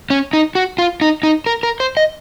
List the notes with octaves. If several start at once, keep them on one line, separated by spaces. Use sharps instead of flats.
C#4
D#4
F#4
F4
D#4
D#4
A#4
A#4
C5
D#5